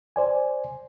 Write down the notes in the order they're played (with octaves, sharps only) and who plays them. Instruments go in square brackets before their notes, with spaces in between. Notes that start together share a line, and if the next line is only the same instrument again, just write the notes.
[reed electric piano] C5 D5 G#5